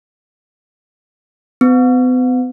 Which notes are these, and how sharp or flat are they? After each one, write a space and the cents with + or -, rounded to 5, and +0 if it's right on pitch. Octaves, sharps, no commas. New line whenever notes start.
B3 +45